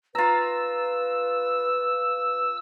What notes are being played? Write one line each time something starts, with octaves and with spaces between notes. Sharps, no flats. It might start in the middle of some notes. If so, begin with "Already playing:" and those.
F4 B4 A#5 E6